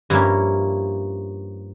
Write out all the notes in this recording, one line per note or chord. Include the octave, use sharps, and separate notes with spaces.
G2 F3 A#3 C#4 E4